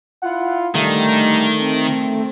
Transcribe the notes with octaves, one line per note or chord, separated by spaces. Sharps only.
E4 F4 F#5
D3 D#3 G3 A3
C4